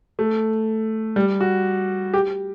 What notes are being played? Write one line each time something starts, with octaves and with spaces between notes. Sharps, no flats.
A3
G3
F#4
G4